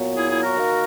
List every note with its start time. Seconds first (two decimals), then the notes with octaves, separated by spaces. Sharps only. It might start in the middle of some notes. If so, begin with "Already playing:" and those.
Already playing: A#2 F#3 B3
0.16 E4 G#4
0.29 E4 G#4
0.43 F#4 A#4
0.57 D#3 A#3